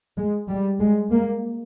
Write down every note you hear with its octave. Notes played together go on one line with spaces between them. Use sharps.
G#3
G3
G#3
A#3